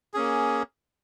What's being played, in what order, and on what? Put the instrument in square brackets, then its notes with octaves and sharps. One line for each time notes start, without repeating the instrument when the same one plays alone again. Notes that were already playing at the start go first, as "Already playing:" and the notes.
[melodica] A#3 C#4 G#4